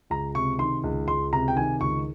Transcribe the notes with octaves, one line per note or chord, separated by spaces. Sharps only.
C#2 A#5
C3 C#6
D#3 C6
C#2
C#2 C6
C3 A#5
G5
D#3 G#5
C#2 C#6